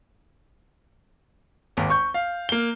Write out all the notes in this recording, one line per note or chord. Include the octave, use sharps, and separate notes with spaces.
G#1 D#2
C#6 G6
F5
A#3 G7